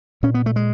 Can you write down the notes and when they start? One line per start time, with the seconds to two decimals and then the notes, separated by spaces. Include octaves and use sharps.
0.23 A#2 C#4
0.34 B3
0.46 A3
0.56 G#3